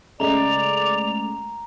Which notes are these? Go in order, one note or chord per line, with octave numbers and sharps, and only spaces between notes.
C#3 G#3 A3 D5 A#5 F7